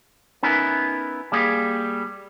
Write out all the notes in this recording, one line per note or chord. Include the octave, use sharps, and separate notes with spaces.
B3 C#4 D#4 E4 A#4 B4
G3 A#3 G#4